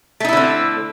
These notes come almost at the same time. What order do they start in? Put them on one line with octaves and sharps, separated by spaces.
A3 D#4 E4 D3 C4